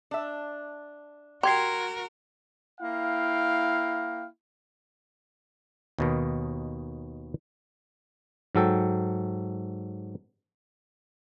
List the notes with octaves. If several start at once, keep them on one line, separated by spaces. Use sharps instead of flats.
D4 E5
F#4 G4 A#4 C6 G#6 C7
A#3 E4 F5 G5
D#2 B2 D#3
G#2 F#3 A4 G5